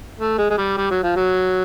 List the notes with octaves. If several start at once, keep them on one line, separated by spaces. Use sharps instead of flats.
A3
G#3
G#3
G3
G3
F#3
F3
F#3